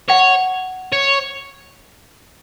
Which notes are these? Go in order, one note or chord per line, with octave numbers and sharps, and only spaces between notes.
C#5 F#5
C#5